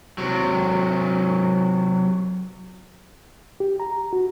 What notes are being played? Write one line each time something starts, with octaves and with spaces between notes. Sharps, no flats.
C3 F#3
G4
A#5
F#4